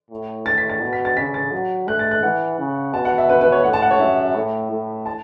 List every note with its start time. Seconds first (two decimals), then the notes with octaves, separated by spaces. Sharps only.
0.11 A2
0.46 A6
0.58 B6
0.69 A6
0.81 B2
0.93 B6
1.05 A6
1.17 C#3 B6
1.34 A6
1.52 F#3
1.88 A3 F#6
1.99 A6
2.11 F#6
2.23 E3 F#5
2.59 C#3
2.93 B2 A5
3.05 F#5
3.18 E5
3.29 B4
3.41 B4
3.52 C#5
3.64 A2 F#5
3.73 A5
3.82 F#5
3.91 C#5
4.00 F#2 E5
4.35 A2
4.71 A2
5.06 A5